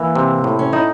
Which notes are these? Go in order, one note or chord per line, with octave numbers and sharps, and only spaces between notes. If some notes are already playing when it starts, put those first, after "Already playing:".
Already playing: E3 A#3
C3
A2
C#4
D#4 E4